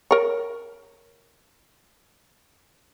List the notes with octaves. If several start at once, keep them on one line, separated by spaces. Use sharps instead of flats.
A#4 C#5